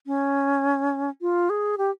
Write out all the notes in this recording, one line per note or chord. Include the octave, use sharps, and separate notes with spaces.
C#4
F4
G#4
G4